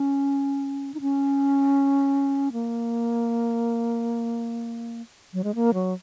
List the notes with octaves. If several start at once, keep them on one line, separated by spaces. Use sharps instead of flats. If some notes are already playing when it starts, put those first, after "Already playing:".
Already playing: C#4
D#4
C#4
A#3
F#3
G#3
A#3
F#3